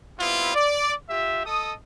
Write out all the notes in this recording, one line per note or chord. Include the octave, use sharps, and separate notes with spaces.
G3 B3 C4 E4 F4
D5
F4 G4 E5
A4 D#5 D#6